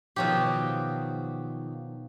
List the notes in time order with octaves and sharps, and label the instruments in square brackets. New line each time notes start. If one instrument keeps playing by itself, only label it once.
[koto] B2 F#3 G4 [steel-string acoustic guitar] D#3 F3 C5